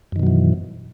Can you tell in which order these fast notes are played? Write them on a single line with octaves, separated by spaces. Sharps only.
F#2 D#3 B2 F#3 E3